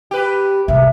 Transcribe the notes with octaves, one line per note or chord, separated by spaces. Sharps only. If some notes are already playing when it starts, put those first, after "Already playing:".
G4 B4
C2 G#2 E5